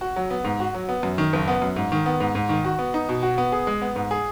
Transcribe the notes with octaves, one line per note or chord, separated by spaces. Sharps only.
F#4
F#3
B3
G#2
F#4
F#3
B3
F#2
D#3
F#1
B3
F#2
G#2
D#3
B3
G#2
G#2
D#3
F#4
B3
D#4
B2
F#4
B3
G#4
G#3
B3
G#2
G#4